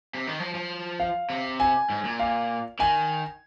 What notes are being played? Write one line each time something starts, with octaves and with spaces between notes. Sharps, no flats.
C3
D#3
F3
F3
F5
C3
G#5
G#2
A#2
F5
D#3 G#5